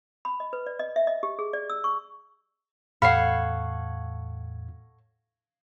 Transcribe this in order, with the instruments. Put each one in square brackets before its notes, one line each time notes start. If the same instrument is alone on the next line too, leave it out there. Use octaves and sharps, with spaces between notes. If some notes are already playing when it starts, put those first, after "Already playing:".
[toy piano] B5
D#5
B4
D5
D#5
E5
D#5
G4
G#4
D5
E6
C#6
[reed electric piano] E2 A2 [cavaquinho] A4 C#5 F#5 [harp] F5 [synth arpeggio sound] B5 C7